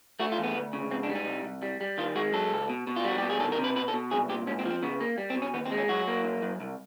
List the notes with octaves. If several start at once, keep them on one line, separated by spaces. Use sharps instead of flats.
A3 F#4
F4
E2
B3
D2
C#3
G#2 C4
D4
G3
D#4
C2
C2
G3
G3
D#3 F4
G#3 F#4
F#3 A4
C#2
B2
B2
F4
G3 F#4
B2 G4
G#4
D#3 A4
A#4
C3
B4
B2 B4
A4
B2
C2 G#4
A#2 G4
G#2 C#4
C4
F3
C4
C#3 B3
A#3
G3
C4
B2
C#4
D#2 B3
C4
G#3
C#4
F#3 F#4
A#3
F#2
F#2
C2